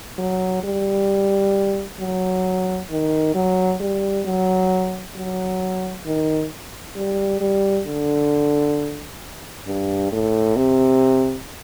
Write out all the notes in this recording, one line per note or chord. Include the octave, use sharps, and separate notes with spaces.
F#3
G3
F#3
D#3
F#3
G3
F#3
F#3
D#3
G3
G3
D3
G2
A2
C3